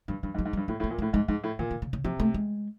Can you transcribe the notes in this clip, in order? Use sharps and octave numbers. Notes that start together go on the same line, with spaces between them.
G2 D3
G2 E3
G#2
F#3
G#2
G3
G2
A2 A#3
A2
A#3
A#2
A3
A2
G#2 G#3
G#2 G#3
A2
A#2 D#3
D3
C#3
C#3
C3 F3
A3
G#3